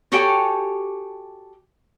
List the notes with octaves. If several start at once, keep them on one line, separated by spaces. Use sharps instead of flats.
F#4 G4 A4 C#5 G5 G#5